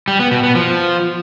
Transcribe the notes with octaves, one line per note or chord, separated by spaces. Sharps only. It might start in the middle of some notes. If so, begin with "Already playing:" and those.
G3
B3
B2
B3
F3